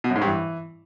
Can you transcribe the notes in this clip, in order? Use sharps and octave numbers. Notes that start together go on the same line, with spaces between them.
B2
F#2
G#2
G2
E3